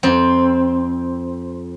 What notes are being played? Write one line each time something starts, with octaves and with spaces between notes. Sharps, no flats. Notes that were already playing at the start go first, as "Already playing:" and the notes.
F2 C4